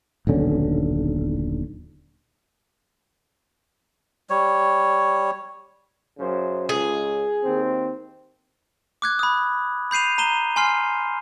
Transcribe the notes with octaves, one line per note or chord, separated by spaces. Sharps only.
D#1 B1 D3 C#4
G3 C#5
F#2 C#3 C5
C#2 G#4
D#2 C4
D6 F#6 G#6
B5 D#6
B5 G6 C7 D#7 F7
A#5 D#7 E7 G7
G#5 C6 F6 C7